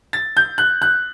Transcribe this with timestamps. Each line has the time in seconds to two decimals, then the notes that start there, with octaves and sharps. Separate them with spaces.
0.13 A6
0.37 G6
0.58 F#6
0.82 F#6